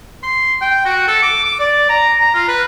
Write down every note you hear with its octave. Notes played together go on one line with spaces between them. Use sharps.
C6
G5
F#4
A4
D6
D6
D5
A#5
A#5
F4
B4